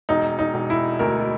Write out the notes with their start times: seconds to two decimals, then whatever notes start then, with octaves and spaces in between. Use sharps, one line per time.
0.09 E1 D#4
0.39 D#4
0.54 E1
0.70 E4
0.99 D2 A#4